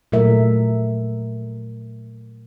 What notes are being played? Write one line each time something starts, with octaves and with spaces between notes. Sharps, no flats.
A#2 F#3 A3 A#4 E5